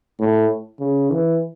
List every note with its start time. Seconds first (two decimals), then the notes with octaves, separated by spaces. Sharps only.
0.19 A2
0.80 C#3
1.11 E3